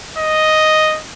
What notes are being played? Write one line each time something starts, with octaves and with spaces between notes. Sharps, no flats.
D#5